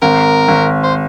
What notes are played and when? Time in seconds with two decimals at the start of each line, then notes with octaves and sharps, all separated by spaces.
0.02 G#1 A#4
0.48 G#1
0.83 C5